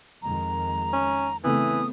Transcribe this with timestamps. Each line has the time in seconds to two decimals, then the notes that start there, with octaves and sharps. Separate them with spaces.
0.23 F2 D#3 G#3 A#5
0.93 C#4
1.44 C#3 E3 A3 B3 C4 D#6